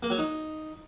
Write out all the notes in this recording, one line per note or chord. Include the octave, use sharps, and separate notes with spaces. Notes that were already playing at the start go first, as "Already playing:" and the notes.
A#3
F#3
D#4